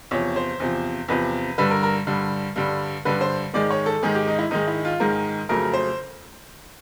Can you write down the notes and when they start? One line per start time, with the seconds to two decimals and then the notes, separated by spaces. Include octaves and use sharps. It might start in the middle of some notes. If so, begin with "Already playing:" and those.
0.11 E2 C3 F3 C#5
0.36 C5
0.60 E2 C3 F3
1.08 E2 C3 F3 B4
1.58 G2 D3 G3 B4
1.71 A#4
1.83 A#4
2.07 G2 D3 G3
2.56 G2 D3 G3
3.05 G2 D3 G3 B4
3.21 C5
3.54 G#2 D#3 G#3 D5
3.71 C#5
3.86 A4
4.03 G#2 D#3 G#3 G#4
4.15 G4
4.28 D#4
4.39 E4
4.51 G#2 D#3 G#3 D#4
4.68 E4
4.85 F4
5.00 G#2 D#3 G#3 A#4
5.49 F2 C#3 F#3 A3 A#4
5.74 C5